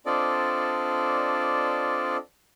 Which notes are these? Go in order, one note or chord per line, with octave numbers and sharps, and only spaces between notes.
C4 D4 F4 A4 D5 D#5